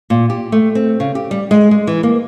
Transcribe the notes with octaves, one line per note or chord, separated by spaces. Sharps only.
A#2
G4
A3
C4
C#3
G4
G3
G#3
G#3
E3
A#3